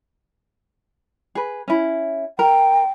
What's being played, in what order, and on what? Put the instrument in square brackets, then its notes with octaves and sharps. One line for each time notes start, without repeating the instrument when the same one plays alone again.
[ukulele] G#4 B4
C#4 E4
[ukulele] A#4 [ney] G5